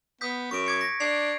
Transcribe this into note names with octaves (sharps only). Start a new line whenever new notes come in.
B3 D#6 G6 B6
F#2 C#6 D7
D6 G#6 C#7
A#6
D4 G#6 C7 F7